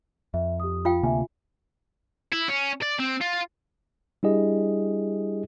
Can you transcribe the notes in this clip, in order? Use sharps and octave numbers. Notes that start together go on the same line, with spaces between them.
F2 E5
G4 D#6
F4 F5 G5
D2 C3 A#3 E5 G#5
E4
C#4
D5
C4
F4
G3 D4 E4 G4 G#4 D#5